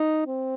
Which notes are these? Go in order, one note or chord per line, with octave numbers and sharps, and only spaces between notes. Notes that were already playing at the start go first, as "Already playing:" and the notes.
Already playing: D#4
C4